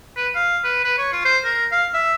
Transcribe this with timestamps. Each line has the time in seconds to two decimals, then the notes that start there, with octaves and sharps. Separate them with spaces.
0.16 B4
0.35 F5
0.64 B4
0.84 B4
0.98 C#5
1.12 F4
1.25 C5
1.44 A#4
1.72 F5
1.94 E5